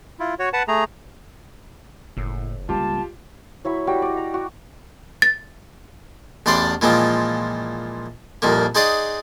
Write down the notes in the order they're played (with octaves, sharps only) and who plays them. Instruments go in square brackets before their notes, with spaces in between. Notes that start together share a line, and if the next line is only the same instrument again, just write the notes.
[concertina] E4 F4
F#4 C#5
B4 F#5 A5
A3 G#4 A#5
[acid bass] F#1 [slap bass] A2
[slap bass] C#2 G3 A#3 [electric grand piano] F4 G4 [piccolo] A5
[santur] F#3 E4 B5 C#6
G3 F#4 G5
D5 D#5
A#5
F#4
[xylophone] A6
[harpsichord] A1 E2 D4 C5 D5 C6
A#2 E3 F3 G#3 C4
C2 F2 A#2 A#3
D#4 G#4 C5 D5 F#5 D#6